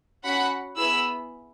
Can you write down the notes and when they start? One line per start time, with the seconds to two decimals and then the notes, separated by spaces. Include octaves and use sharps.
0.24 C#4 F#4 F#5 B5
0.77 B3 E4 G#4 B5 E6